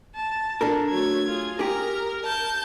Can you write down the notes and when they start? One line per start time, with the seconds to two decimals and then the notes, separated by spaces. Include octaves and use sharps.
0.15 A5
0.61 D4 A4 A#4
0.90 F#3 A3 G#6
1.26 F4 G#4
1.59 G4 G#4 A#4 A#5
2.25 A5 G6